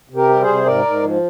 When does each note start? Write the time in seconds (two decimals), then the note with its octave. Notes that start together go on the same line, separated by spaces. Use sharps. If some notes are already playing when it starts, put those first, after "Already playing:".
0.10 C3
0.16 G4 A#4
0.29 G3
0.41 G#4 C5
0.47 C3
0.66 G#2 A#4 D5
0.85 G#2
1.03 F3